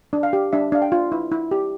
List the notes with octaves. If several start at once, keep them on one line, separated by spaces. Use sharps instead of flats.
D4
F5
G4
D4 E5
D4 F5
G5
F4
E4
E4
G4